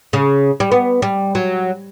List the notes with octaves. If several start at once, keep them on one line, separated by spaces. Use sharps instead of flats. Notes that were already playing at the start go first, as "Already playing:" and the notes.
C#3
G3
B3
G3
F#3